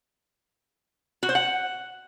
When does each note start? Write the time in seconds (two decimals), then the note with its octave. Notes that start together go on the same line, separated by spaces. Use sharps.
1.23 F#4
1.29 C5
1.35 F#5